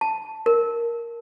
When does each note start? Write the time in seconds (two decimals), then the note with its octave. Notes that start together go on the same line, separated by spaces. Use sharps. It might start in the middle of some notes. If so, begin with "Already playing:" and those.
0.01 A5
0.46 A#4